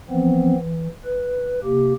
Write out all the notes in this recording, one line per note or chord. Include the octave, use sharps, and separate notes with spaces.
E3 F3 B3 C4
E3
B4
C3 A#3 G4